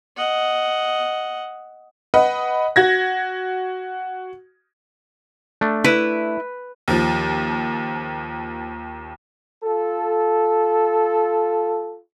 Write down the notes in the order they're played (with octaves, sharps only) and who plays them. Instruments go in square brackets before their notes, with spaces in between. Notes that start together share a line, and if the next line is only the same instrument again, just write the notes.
[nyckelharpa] D#5 F#5
[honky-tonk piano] B4 D#5 F#5
F#4 G#6 A#6
[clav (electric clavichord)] A3 D4
[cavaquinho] E4 [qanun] B4
[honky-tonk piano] D#2 F3
[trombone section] F4 A4